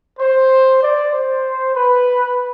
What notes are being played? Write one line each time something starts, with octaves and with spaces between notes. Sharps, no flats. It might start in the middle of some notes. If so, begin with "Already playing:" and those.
C5
D5
C5
B4